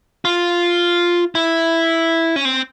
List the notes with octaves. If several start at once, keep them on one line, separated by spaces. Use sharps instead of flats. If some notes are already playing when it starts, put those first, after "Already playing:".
F4
E4
C#4
C4